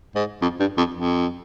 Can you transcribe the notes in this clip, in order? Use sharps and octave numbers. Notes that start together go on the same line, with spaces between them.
G#2
F2
G2
F2
F2